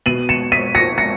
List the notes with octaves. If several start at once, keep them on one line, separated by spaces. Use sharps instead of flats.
B2 D#7 F#7
C#7 E7
B6 D#7
A#6 C#7
A#6 C#7